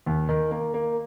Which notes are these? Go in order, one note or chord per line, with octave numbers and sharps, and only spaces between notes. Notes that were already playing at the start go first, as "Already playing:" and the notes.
D#2
D#3
A#3
A#3